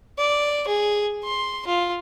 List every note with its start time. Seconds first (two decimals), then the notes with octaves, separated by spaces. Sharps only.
0.19 D5
0.68 G#4
1.25 C6
1.67 F4